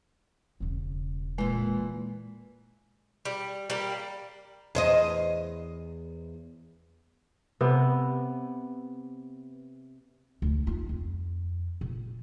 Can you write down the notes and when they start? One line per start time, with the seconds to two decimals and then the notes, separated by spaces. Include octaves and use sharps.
0.60 E1 C#3
1.38 A#2 E3 G#3
1.55 E1
3.25 G3
3.70 G3 A#3
4.75 E2 C5 D#5
7.61 C3 B3
10.42 D2
10.67 D#2 F4
10.89 F2
11.81 A#2